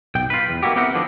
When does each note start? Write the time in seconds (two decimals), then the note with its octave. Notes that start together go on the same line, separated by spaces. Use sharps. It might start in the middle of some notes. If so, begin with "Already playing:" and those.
0.15 B1 G5
0.30 F4 B4
0.48 E2
0.63 A#3 E4 F#4 G4
0.76 B3 C4 E4 G4 A#4 F#5
0.94 D3 F3 B3 D4